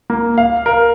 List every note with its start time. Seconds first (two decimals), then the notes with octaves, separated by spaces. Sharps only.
0.10 A#3
0.38 F5
0.66 A#4